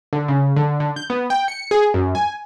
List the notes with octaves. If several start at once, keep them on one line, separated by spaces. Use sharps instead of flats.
D3
C#3
D3
D3
G6
B3
G5
C#7
G#4
F#2
G#5